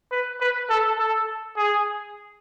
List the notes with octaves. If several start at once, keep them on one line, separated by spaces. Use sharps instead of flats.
B4
B4
A4
A4
G#4